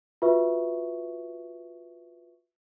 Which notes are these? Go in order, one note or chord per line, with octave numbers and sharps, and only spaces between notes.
F4 F#4 B4 E5 C#6